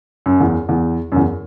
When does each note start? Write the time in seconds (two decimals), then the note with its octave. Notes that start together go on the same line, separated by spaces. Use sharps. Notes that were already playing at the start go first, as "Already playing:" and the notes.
0.26 F#2
0.40 E2
0.69 E2
1.12 F#2
1.16 E2